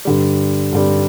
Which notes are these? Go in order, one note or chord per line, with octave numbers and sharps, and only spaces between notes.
G2 D3 G3
G2 D3 G3